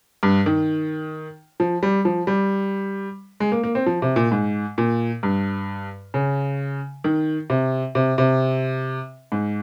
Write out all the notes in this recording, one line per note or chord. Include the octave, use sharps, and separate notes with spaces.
G2
D#3
F3
G3
F3
G3
G#3
A#3
A#3
C4
F3
C3
A#2
G#2
A#2
G2
C#3
D#3
C3
C3
C3
G#2